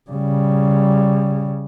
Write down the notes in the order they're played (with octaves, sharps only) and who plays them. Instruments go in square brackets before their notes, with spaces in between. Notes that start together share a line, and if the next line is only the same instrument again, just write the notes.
[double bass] C#3 G3